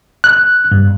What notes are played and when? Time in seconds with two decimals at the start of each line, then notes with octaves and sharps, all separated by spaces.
0.24 F#6
0.72 G2